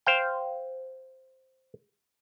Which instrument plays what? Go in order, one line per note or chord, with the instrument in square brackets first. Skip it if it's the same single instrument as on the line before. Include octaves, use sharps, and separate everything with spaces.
[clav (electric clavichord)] C5 F5 G5